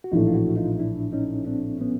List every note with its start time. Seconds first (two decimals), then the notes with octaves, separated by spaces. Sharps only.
0.04 F#4
0.12 A#1 A2 E3 A3 D#4 F4
0.27 F4
0.34 E4 F#4
0.57 D#4 F4
0.75 D#4
0.80 D4 E4
1.13 C#4 D#4
1.46 C4 D4
1.81 B3 C#4